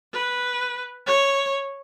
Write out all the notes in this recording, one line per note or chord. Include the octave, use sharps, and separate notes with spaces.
B4
C#5